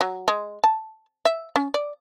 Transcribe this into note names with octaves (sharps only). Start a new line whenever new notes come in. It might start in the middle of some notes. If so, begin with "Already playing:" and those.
F#3
G#3
A5
E5
C#4
D5